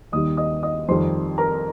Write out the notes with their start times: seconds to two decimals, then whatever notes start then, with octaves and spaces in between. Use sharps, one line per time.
0.12 D#2 D#3 G3 D#5 D#6
0.37 D#5 D#6
0.63 D#5 D#6
0.88 F2 D#3 G3 C5 C6
1.38 A#4 A#5